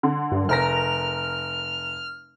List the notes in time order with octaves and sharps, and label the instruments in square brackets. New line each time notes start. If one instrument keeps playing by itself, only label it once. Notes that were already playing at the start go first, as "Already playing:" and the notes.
[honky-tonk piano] D3
[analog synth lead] G2
[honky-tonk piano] F1 A#4 A#6 [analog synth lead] F6